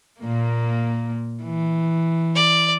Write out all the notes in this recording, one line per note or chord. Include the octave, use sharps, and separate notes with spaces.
A#2 A#3
E3
D5